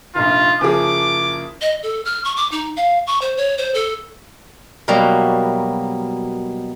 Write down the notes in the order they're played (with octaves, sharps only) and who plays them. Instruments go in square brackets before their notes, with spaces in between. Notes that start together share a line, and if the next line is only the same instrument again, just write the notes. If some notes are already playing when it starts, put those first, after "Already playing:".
[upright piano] F1 A#1 [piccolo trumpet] F4
[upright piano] F#1 F3 G#4 [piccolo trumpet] D6
[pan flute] D#5
A4
F6
C#6
D6
D#4
F5
C#6
C5
C#5
C5
A4
[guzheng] B2 F#3 G3 A#3